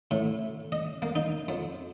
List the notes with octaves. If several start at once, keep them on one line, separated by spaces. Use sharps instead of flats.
A2
D#5
A#3
D#4
F2